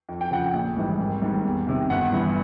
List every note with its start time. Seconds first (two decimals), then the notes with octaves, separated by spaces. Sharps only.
0.09 F2
0.21 G5
0.31 C#3 F3 F#5
0.46 G5
0.53 A#1
0.77 G#2 E3 G3
0.99 G#1
1.22 G#2 D#3 G3
1.44 E2
1.67 C3 D#3
1.90 G1 F#5
2.12 G2 E3